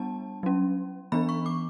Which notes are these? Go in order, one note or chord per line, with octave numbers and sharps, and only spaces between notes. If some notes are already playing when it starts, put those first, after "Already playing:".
Already playing: G3 B3 D4 A5
F#3 C#4
E3 B3 D4 B5
C#6
D6